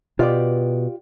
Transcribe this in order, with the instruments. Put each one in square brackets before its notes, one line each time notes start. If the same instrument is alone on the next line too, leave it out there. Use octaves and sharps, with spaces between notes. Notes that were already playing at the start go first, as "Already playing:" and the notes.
[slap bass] B2 [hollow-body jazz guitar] F4 G4 D5